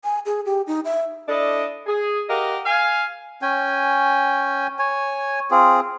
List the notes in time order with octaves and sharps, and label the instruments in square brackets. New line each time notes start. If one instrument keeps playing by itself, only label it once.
[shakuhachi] G#5
G#4
G4
D#4
E5
[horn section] D4 E4 A4 D5 D#5
G#4
G4 A#4 D#5 F5 F#5
F5 G#5
[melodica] C#4 G5 G#5
C#5 G#5
C4 F4 G#4